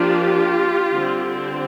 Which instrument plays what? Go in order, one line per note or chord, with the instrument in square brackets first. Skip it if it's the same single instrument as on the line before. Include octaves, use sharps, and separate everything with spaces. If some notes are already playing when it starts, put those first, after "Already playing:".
Already playing: [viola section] F3 A#3 D4 F4 G4
D3 G3 C4